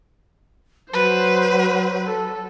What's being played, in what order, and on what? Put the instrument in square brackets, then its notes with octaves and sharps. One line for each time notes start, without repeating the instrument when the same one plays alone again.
[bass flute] F#3 [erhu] B4 [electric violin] C5
[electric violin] A4